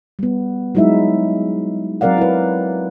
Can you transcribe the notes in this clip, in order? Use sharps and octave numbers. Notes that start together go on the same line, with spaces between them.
G3 B3
F#3 G#3 D#4 E4 E5
F#3 C4 A#4 D5 F5 F#5
E4 B4